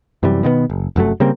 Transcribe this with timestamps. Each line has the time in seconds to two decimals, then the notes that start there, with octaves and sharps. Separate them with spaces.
0.23 F#2 C3 E3 G3
0.43 B2 D#3 G#3 B3
0.70 F#1
0.96 F1 F#2 F#3 A3
1.20 C#3 G3 A#3 C4